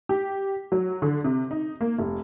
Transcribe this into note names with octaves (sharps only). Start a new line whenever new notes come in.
G4
F#3
D3
C3
D#4
A#3
F1